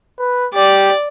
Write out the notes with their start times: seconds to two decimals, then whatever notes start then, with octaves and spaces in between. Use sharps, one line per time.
0.19 B4
0.54 G4 D5